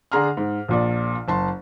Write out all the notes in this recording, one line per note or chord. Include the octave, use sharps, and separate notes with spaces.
D3 D4 G#4 A#5 C6 F6
G#2
A#1 A#2 D5
F#1 A5 C6